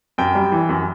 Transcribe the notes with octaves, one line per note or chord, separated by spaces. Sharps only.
F#2 G5
G3
E3
F#2